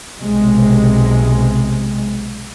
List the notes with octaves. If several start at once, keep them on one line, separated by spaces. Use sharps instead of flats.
B1 C3 G#3